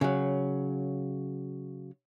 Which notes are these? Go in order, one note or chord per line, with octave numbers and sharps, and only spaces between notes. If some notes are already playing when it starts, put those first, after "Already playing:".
C#3 F#3